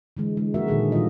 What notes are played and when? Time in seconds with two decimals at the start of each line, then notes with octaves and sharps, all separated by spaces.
0.17 D3 E3 G#3
0.37 G#3
0.54 F3 G#3 A#3 F#4 A#4 E5
0.68 A#2 D3 D#3 D#4 G#4 A4
0.92 A#2 C#3 F3 G3 F4 D#5